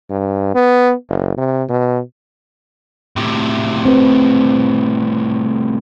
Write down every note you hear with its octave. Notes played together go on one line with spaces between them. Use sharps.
G2
B3
F#1
C3
B2
A2 C3
C4 B4